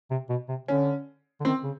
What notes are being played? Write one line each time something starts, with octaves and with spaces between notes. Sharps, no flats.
C3
B2
C3
D3 C#4
D3
D#3 C4
C#3